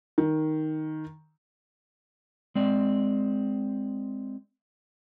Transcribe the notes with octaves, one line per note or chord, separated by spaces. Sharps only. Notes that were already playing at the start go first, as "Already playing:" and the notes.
D#3
G#3 C4 D5